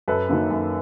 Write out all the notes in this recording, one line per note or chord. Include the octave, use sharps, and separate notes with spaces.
F#2 A4 B4
D#3 F#3 A#3
F#2